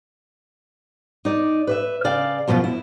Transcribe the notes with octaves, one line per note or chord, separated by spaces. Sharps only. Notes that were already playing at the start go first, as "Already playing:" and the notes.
D#4 D5
B4 D5 E5
C#3 D5 F5 G5
F#2 B2 F3 C#4 F4
E4